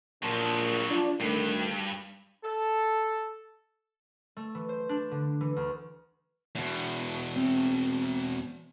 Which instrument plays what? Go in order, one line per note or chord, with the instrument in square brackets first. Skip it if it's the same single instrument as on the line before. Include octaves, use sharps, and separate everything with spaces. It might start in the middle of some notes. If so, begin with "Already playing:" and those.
[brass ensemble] A#1 A#2 [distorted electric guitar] F3 F#3
[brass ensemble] D4 F4
[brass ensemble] D2 D#3 [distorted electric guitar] G2
[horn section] A4
[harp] A3
E3
C5
D4
D3
E3
D2
[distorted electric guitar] E2 B2
[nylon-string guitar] C4